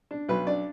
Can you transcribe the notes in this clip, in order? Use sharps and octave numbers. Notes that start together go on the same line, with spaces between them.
D4
B1 B4
D4 D5